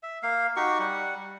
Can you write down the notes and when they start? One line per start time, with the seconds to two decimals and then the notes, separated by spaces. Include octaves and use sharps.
0.03 E5
0.23 A#3 F5
0.56 D#4 F#4 G4 C#6
0.79 G3 F#5